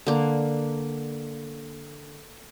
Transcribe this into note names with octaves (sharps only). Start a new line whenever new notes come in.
D3 A#3